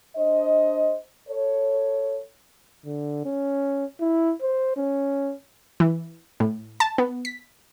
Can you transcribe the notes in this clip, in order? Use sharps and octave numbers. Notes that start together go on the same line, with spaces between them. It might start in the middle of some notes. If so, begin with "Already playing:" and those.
D4 C5 D#5
A4 C#5
D3
C#4
E4
C5
C#4
E3
A2
A5
B3
B6